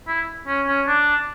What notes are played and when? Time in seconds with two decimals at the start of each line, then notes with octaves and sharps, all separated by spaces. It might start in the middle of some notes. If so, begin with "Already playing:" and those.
0.08 E4
0.47 C#4
0.67 C#4
0.87 D4